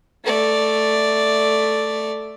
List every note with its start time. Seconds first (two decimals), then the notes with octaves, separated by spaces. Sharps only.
0.25 A3 D5